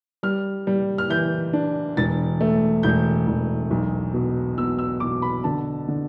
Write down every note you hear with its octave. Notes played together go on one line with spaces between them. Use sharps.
G3 F6
G3
F6
E3 G6
D4
E1 A6
A3
E1 G6
E1
B1
B2
B2 E6
E6
B2 D6
B5
D3 A5
D3